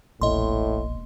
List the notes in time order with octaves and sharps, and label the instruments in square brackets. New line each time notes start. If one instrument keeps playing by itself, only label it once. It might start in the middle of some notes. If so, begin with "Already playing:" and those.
[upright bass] E1 A#3 [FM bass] A#1 [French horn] A2 [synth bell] D#5 C6